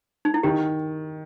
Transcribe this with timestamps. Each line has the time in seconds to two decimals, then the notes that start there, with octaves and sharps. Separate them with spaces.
0.25 D#4
0.34 E4
0.43 D#3 G4